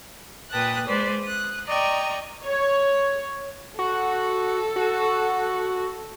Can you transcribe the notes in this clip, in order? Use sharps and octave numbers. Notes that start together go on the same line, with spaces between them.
A#2 B4 G5 A5 D#6 F#6
G#3 B4 C5 D5
D#6 F#6
D5 D#5 G5 A#5 C#6
C#5
F#4 A4
F#4